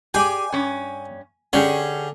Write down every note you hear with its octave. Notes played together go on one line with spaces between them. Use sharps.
G4 G#4 D5 G#5
G2 C#4
D3 C#4 G4 G#4